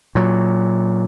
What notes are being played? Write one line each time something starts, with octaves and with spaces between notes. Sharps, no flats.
A#2 F#3